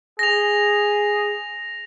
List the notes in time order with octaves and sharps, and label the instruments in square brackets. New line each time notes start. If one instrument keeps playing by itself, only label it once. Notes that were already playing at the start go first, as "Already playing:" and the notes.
[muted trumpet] G#4 [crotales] A#6 F7